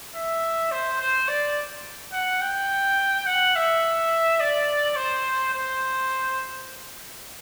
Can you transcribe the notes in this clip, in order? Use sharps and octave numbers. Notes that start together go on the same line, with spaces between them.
E5
C5
C5
D5
F#5
G5
F#5
E5
D5
C5
C5